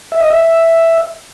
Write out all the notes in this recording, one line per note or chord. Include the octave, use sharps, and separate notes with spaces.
E5
D#5
E5